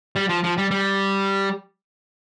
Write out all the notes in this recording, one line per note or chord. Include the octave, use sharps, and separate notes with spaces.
G3
F3
F3
G3
G3